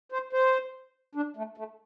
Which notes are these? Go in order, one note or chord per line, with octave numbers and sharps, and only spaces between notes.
C5
C5
D4
A3
A3